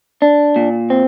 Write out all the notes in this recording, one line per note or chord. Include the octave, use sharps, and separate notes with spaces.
D4
A#2
C4